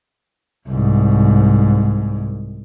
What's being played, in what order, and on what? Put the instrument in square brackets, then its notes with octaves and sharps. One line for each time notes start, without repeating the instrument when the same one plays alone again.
[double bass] C2 G#2